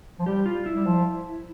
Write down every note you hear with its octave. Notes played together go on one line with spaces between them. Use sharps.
F3
G3 G4
F4
E4
G3
F3